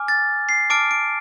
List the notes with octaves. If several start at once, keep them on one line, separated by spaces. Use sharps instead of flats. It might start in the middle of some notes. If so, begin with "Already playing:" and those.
Already playing: G#5 D6 F6
A6
C7
A5 D6 F6 D7
D7